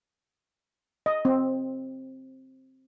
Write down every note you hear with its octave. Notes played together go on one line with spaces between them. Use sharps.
D#5
C4